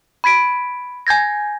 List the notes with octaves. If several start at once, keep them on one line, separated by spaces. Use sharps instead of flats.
B5 G#6 B6 D7
G#5 G6 G#6 A#6